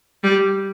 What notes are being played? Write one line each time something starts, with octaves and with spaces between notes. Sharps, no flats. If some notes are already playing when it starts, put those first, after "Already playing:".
G3